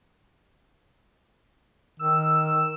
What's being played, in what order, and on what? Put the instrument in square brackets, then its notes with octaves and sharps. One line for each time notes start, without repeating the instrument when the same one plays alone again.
[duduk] D#3 [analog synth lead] E6